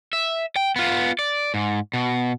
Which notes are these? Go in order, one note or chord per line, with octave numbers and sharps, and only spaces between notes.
E5
G5
B3 F4
D5
G#2
B2